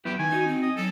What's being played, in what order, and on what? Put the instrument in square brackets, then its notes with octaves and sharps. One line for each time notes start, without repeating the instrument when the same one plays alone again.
[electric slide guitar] F#2 B3 E4 [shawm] G4
[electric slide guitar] D#3 [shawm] G#5
[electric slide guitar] D#4 [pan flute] F#4
[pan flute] C4
[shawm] D#5
[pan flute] F#3 [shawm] A4